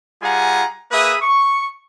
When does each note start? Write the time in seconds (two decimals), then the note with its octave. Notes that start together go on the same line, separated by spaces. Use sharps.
0.22 G3 F4 G#4 F#5 G#5 A#5
0.91 A#3 G#4 B4 E5 B5 D#6
1.22 C#6